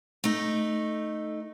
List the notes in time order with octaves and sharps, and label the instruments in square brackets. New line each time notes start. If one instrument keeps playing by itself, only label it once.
[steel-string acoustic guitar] A3 D#4